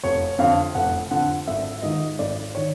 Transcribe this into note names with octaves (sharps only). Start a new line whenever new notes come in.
F1 C#5
F2 D3 F5
F1 F#5
F2 D3 F#5
G#1 E5
G#2 D#3 D#5
G#1 D5
D#3 C#5